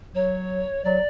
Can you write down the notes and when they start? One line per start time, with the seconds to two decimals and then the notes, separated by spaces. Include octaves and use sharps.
0.14 F#3 C#5
0.84 F#3 D5